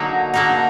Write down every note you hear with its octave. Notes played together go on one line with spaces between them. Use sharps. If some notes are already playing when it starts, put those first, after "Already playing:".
Already playing: D3 F#3 A#3 D#4
D3 F#3 A#3 D#4